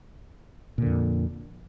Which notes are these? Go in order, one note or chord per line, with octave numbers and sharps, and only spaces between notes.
F2 A#2 D3